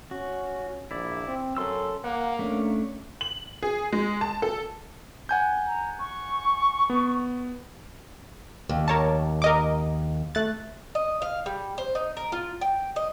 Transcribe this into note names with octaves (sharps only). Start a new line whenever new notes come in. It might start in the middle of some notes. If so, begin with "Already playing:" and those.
C#4 F#4
A#1 E4 D5
C4
F#2 A4 C6 E6
A#3 F#5
A3 C#4 D4
F#7
G#4
G#3
A5
A4
F#5 G#5 G6
A#5
C#6
B3
D#2
A#4 C#5 A5
A#4 D#5 D6
A3 F#6 A6
D#5
F5
G3
C5
D#4
A#4
F4
G5
D#5